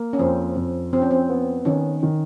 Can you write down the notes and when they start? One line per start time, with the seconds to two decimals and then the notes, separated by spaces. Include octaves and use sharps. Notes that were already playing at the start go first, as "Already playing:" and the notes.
Already playing: A#3
0.13 C#4
0.19 F2 C4
0.56 F2
0.93 F2 C4
1.02 C#4
1.11 C4
1.30 B3
1.65 D#3 C#4
2.03 D#3